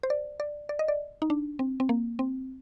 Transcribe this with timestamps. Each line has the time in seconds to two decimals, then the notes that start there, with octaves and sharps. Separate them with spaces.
0.03 C5
0.10 D5
0.40 D5
0.69 D5
0.79 D#5
0.88 D5
1.22 D#4
1.30 D4
1.59 C4
1.80 C4
1.89 A#3
2.19 C4